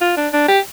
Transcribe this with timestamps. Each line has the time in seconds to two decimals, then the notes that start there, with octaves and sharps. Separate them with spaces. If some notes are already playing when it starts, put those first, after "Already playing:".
0.01 F4
0.17 D4
0.33 D4
0.48 G4